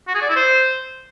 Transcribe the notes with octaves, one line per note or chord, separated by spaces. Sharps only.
F#4
G#4
D5
E4
C5